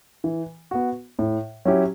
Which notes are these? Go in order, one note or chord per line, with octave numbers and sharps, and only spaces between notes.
E3
B3 F#4
A2
F#3 C#4 E4 G4